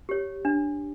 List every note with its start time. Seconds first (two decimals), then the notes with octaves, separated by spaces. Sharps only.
0.09 G4 C#5
0.45 D4